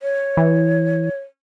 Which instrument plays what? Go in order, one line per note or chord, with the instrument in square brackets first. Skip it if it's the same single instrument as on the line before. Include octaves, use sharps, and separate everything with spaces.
[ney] C#5
[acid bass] E3